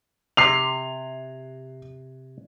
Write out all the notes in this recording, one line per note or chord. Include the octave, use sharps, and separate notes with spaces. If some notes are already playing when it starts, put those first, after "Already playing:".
C3 C7 F7